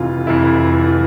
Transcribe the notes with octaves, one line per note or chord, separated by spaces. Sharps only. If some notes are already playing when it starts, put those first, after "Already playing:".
Already playing: F1 F2 E3 F4
F1 F2 E3 E4
E3